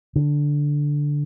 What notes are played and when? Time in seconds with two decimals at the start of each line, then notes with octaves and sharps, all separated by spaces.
0.16 D3